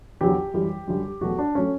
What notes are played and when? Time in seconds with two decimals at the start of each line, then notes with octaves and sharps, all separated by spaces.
0.21 E2 D3 F#3 G4
0.54 F#2 E3 G3
0.87 F#2 D3 G3
1.21 E2 B2 F#3 A3 F#4
1.38 D4
1.55 F#3 A3 C#4